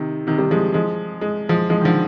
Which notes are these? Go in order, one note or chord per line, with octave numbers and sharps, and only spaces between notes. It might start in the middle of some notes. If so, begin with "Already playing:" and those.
Already playing: C3 D#3
C3 D#3
D#3 G3
F3 G#3
F3 G#3
G#3
F3 G#3
F3 G#3
D#3
D3 F3